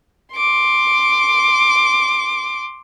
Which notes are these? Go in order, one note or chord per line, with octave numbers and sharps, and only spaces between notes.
C6 D6